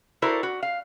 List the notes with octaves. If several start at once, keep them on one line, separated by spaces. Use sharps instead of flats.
E4 F#4 A4 A#4 C5 D5
F#4
F5